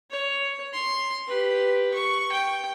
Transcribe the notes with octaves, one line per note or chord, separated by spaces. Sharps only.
C#5
C6
G4 B4
C#6
G5